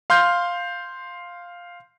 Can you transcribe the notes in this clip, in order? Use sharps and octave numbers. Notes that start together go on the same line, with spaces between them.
F5 C6 F6 G6